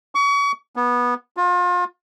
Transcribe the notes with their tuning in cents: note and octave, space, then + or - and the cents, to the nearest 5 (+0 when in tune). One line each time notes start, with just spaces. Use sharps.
C#6 +35
B3 -15
F4 +35